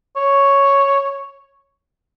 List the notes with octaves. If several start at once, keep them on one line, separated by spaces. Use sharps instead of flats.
C#5